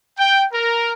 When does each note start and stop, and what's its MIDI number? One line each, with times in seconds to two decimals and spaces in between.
0.18 0.44 79
0.53 0.93 70